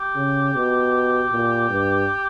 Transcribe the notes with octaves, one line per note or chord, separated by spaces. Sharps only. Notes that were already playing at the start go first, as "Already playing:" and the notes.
Already playing: G4
C#3
B2
A#2
G2